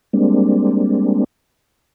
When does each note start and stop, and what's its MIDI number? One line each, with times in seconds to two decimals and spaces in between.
0.13 1.24 55
0.13 1.24 56
0.13 1.24 58
0.13 1.24 60
0.13 1.24 62